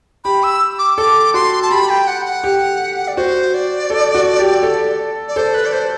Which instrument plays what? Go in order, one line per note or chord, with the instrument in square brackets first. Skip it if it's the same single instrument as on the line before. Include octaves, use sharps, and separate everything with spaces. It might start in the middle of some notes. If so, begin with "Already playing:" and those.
[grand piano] G4 [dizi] B5
[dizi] E6
D6
[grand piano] A4 [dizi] D6
[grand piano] F#4 [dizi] C6
[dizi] A5
[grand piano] G4 [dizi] B5
[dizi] G5
F#5
F#5
[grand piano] G4
[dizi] D5
[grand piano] F#4 [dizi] C5
[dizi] D5
[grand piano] A4
F#4
G4
A4
[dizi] D5
[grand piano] A4 [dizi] C5
[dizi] B4
D5
C5